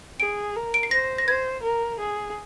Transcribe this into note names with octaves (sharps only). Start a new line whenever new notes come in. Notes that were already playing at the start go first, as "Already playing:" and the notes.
G#4 D7
A#4
D7
C7
C5 A#6
A#6
C5 G#6
A#4
G#4